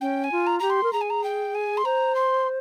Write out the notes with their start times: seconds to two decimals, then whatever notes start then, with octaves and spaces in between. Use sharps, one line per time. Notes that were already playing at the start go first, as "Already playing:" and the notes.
0.01 C#4 G5
0.24 G#5
0.32 F4
0.46 A#5
0.59 G4 A#5
0.70 C6
0.83 A#4
0.93 G#4 A#5
1.01 G#5
1.10 A#5
1.24 G5
1.55 G#5
1.77 C6
1.85 C5 A#5
2.15 C6